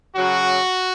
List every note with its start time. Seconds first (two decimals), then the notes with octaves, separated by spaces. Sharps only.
0.16 C#3 F#3 F#4